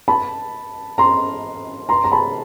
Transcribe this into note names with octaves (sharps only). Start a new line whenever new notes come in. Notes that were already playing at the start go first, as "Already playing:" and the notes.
A5 B5
A#5 C6
A#5 C6
A#5
A5 B5